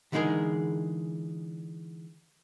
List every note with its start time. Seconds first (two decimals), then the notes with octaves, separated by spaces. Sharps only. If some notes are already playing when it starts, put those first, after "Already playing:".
0.12 D3 E3 G#3 D#4 G#4 A#4